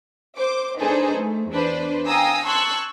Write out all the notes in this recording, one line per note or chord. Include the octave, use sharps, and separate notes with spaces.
C5 D6
D4 D#4 G#4 A4 B4 C5
A3
E2 D4 B4 C5
F5 G5 G#5 A#5 D#6 E6
A5 C6 C#6 E6 F#6 G#6